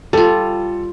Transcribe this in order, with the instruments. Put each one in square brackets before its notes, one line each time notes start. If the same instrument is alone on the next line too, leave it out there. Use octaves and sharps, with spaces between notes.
[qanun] G3 F4 [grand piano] A4